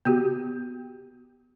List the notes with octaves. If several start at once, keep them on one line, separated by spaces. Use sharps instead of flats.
B3 F#4 G4